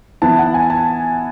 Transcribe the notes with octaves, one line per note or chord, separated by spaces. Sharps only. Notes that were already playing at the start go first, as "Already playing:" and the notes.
E3 B3 E4 A5
F#5
G#5
A5